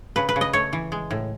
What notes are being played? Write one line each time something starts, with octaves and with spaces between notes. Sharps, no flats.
C#3 B4
B4
C#3
D#5
A3 C#5
E3
G#3
A2